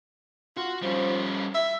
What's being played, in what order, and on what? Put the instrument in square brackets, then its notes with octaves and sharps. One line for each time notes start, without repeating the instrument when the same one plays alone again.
[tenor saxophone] F4 [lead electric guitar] F#4
[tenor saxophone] F3 [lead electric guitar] G3 C#4
[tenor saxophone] E5